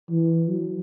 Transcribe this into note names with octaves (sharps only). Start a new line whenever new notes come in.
E3
F#3